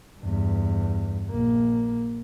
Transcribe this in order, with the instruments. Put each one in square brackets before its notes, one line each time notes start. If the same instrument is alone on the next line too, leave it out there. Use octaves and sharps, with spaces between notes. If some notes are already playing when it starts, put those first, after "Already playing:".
[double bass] E2 G2
A#1 A#3